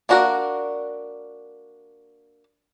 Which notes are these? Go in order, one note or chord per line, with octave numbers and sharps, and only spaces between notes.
A#3 D4 F#4 A4 A#4